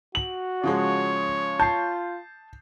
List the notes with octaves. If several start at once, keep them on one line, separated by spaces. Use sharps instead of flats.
F#4 F#7
C#3 F3 G#3 C#5
F4 A5 G6 C7